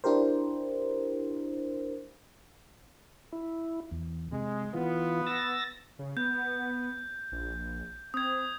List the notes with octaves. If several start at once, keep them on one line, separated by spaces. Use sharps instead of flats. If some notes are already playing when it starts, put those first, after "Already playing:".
D4 E4 G4 A#4 C5
E4
E2
C3 G#3
E3 B3 F4
E6 A6 A#6
C#3
B3 G6
A#1
C4 D#6 G#6